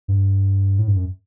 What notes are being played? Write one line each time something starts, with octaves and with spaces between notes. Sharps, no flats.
G2
A2
G2
F#2